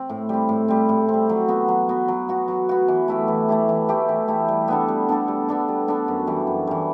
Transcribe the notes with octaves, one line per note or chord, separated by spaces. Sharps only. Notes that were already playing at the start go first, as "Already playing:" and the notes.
Already playing: C4
A2
G3 C4
A2
G3 C4
A2
C4
G3
F#3
B3 F#4
F#3
B3 F#4
F#3
B3 F#4
F#3
B3 F#4
E3
A3 E4 G4
E3
A3 E4 G4
E3
A3 E4 G4
E3
A3 E4 G4
G3
B3 D4 A4
G3
B3 D4 A4
G3
B3 D4 A4
G3
B3 D4 A4
F#2
E3 G3
F#2
E3 G3